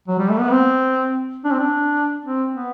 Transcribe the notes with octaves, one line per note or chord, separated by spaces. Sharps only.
F#3
G3
A3
B3
C4
D4
C4
D4
C4
B3